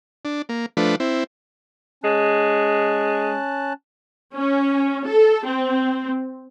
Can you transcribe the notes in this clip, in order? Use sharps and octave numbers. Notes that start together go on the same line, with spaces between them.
D4
A#3
F3 A3 D4 B4
C4 E4
G#3 C#4 A5 F#6
C#4
A4
C4